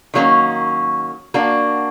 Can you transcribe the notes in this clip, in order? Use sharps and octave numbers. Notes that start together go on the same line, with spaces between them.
D#3 F#3 A#3 C#4
A#3 D4 F#4